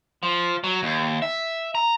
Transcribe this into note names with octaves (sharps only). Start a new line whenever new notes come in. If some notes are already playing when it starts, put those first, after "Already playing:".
F3
F#3
D#2
E5
A#5